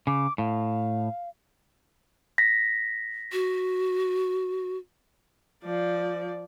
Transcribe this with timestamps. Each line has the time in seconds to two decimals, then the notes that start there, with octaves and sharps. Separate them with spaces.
0.07 C#3 D6
0.38 A2 F5
2.38 A#6 B6
3.32 F#4
5.64 F3 D5